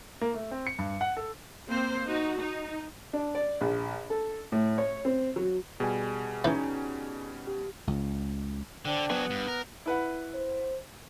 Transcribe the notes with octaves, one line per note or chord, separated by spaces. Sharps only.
A#3
A3
C4
C#7
G2
F#5
A4
A#3 C4 C5
D#4 F#4
D#4
D4
D5
A#1
A4
A2
C#5
C4
F#3
B2 G3 G#4 G#5
E3 C#4 D#4
G4
C#2
D3 D4 C5 G5
F#3 B3 G#4
G2 F#6
A#4
E4 B4 F#5
C5